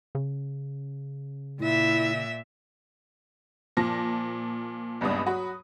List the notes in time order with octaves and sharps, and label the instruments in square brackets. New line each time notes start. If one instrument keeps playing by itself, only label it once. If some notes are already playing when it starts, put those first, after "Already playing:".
[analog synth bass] C#3
[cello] A#2 E5 [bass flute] E4
[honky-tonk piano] A#2 F3 A5 A#6
C#2 G2 A#2 B3 D4 D#6
F#3 F#4 B5